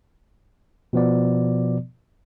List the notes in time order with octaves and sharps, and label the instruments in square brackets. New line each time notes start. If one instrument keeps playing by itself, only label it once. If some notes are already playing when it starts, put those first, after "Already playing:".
[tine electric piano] B2 F3 B3 D5